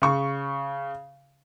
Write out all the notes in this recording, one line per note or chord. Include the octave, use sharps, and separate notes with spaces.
C#3 C#6